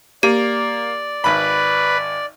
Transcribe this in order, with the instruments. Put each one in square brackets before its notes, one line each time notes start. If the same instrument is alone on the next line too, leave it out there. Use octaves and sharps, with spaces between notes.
[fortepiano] A#3 [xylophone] G4 [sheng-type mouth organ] D5
[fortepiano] G#1 B5 [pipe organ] B4